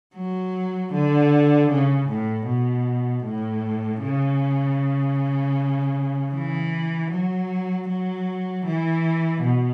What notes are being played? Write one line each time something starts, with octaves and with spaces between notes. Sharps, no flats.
F#3
D3
C#3
A2
B2
A2
C#3
E3
F#3
F#3
E3
B2